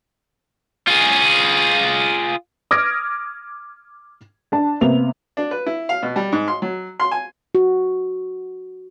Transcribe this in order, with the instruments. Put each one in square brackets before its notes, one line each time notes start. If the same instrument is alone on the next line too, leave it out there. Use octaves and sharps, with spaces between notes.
[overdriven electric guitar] F4 G#4
[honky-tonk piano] D6 D#6 F6 G#6 A#6 D7
D4 A5
C3 A#3 B3 F7
[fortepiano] D4
B4
E4
F5
B2
G3
G#2
C6
F#3
C6
G#5
[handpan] F#4